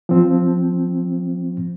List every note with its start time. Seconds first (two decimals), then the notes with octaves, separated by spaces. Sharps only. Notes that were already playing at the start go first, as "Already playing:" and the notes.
0.09 F3 C4